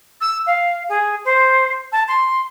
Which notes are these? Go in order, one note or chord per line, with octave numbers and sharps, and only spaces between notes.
E6
F5
G#4
C5
A5
C6